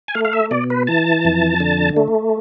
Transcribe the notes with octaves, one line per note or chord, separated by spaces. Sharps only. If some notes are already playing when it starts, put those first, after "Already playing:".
G#5
A3 F5
F5
E5
B2 D5
B4
E3 A5
F2
D3
A3